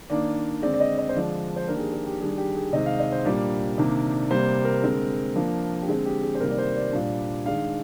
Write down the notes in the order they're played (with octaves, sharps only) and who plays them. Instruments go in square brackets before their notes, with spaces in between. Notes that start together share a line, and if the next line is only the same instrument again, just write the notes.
[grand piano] D#3 A#3 D4 D5
D3 G#3 C4 D5
D5
D#5
D#5
C5
D3 F3 G#3 D4 D5
C5
D#3 A#3 D4 A#4
G4
G#4
G#4
G4
D#3 G3 D4 G#4
G4
G#4
C3 D#3 G#3 C4 D#5
F5
D#5
C5
A#2 G3 A#3 D4 D5
C3 D#3 A#3 D4
C3 G3 A#3 C5
A#4
D3 G#3 C4
F3 A#3 D4
G4
D3 G#3 C4 G#4
G4
G#4
C5
C3 D#3 G3 A#3 A#4
D5
C5
D5
A#2 G3 D4
D#3 G#3 D4 F5